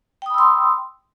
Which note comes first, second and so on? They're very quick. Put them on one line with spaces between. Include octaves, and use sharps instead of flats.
G5 D#6 B5 E6 C6